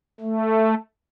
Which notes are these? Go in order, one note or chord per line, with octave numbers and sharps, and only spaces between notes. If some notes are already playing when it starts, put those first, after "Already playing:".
A3